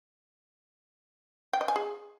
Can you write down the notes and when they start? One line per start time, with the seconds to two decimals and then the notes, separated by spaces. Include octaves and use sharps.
1.53 G5
1.61 D#5
1.68 G#5
1.76 G#4